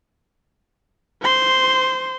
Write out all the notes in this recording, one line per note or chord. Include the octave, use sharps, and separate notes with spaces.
C5 C6